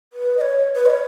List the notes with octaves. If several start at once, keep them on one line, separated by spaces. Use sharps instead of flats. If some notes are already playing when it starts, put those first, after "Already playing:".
B4
D#5
C#5
B4
D#5
C#5